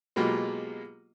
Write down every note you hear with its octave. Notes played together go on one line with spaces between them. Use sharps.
B2 F#3 G#3 A#3 F4 G4